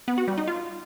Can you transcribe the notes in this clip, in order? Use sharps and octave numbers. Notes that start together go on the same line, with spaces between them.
B3
F#4
G3
D#4
F4